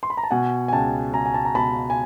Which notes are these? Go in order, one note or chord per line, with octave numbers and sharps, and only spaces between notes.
C6
B5
A#5
A5
B2 F#5 G#5
G#5
C#2 G5 A5
C#2 G#5 A#5
G#5
A5
A#5
B2 A5 B5
G#5